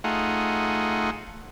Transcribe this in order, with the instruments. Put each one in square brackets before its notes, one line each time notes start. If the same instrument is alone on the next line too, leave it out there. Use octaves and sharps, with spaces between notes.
[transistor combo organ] A3 D#4 F4 G#4 F#5